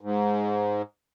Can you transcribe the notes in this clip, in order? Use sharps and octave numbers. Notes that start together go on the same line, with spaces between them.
G#2